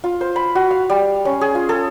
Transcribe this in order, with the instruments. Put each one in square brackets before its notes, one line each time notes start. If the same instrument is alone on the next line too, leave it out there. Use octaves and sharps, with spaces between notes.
[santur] F4
C5
B5
F#4
F5
G3
C#4
G#4
F4
A4